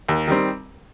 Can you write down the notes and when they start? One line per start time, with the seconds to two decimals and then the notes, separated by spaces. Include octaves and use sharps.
0.09 D#2
0.28 D#3 G3 C4